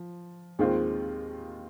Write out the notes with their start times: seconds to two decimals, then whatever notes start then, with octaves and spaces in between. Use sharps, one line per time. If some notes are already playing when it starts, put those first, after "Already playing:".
Already playing: F3
0.59 D#2 D#3 G#3 C4 F4